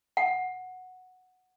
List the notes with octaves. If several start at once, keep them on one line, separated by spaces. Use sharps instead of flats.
F#5